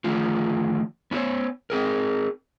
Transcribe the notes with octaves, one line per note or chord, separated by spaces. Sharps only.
D3 D#3 F3 A3 F4
B3 C#4 F#4 C5 C#5
C4 G#4 A#4